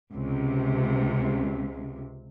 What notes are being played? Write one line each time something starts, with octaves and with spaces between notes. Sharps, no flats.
C#2 C3